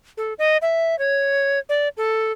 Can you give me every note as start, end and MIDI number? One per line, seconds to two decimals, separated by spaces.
0.17 0.33 69
0.39 0.57 75
0.62 0.98 76
0.99 1.59 73
1.69 1.88 74
1.97 2.32 69